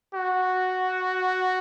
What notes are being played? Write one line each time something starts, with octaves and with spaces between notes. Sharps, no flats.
F#4